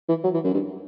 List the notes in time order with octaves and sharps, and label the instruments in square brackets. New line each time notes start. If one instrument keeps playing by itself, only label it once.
[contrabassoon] E3
F#3
E3
F#2
G2